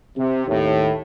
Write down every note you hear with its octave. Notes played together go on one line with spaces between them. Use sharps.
C3
D#2 A2